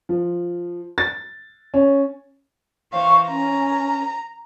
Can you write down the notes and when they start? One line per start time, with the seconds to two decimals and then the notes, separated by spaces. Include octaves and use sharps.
0.09 F3
0.98 A6
1.74 C#4
2.93 E3 C5 F5 C#6
3.27 C#4 A#5